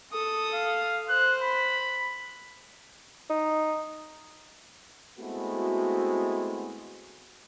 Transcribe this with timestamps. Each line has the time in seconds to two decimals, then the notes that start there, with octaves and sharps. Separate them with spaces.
0.12 A4 D#6
0.54 F5
1.09 C5 F#6
1.43 B5
3.30 D#4
5.18 G#3 A3 B3 C4 E4 F#4